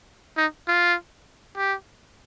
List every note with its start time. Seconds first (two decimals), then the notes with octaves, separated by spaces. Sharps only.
0.37 D#4
0.67 F4
1.56 G4